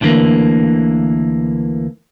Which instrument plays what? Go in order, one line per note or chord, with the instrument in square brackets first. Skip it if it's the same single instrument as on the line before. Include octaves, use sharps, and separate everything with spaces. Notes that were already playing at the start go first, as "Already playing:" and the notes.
[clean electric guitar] D2 D3 E3 A3 A#3